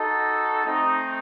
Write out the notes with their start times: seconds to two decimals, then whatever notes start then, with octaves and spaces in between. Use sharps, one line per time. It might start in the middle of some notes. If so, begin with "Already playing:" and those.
Already playing: D#4 F#4 A4
0.66 A3 C4 D#4